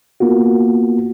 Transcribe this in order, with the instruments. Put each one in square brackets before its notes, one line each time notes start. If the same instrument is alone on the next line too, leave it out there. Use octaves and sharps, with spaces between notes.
[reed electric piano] A#3 B3 F4 F#4